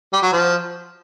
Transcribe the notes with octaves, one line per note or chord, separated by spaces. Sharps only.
G3
F#3
F3